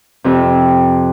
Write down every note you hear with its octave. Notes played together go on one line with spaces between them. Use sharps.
F2 C3